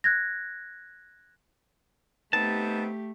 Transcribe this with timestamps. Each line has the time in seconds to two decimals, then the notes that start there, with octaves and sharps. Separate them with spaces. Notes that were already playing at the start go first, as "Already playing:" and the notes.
0.04 F#6 G#6 A#6
2.33 A3 B3 C4 D#4 G4 A5